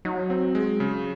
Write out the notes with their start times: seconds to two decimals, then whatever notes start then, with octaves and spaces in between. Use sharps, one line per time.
0.05 F#3 D#4
0.30 C4
0.55 G#3
0.80 C#3